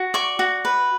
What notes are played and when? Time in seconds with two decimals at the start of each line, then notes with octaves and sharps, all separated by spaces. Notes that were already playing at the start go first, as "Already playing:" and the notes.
Already playing: F#4
0.14 D5 C#6
0.39 F#4
0.65 B4